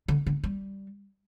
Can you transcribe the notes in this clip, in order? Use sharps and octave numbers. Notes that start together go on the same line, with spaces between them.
D3
D3
G3